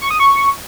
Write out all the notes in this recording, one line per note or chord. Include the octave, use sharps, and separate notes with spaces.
C#6
D#6
C#6